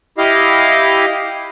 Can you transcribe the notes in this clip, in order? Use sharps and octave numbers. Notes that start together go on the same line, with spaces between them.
E4 G4 D#5 F5